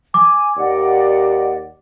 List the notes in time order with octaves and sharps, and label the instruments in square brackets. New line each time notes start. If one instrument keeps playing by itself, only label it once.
[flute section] G#5 [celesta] D6
[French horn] D#2 [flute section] D5 D#5 F#5